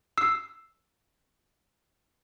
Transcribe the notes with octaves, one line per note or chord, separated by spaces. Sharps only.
E6 C7